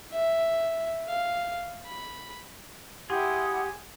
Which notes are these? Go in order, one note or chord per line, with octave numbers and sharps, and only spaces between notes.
E5
F5
B5
E4 G4 G#4 F#5 C6 D#6